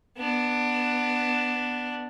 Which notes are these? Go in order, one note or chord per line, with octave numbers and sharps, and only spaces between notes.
B3 D4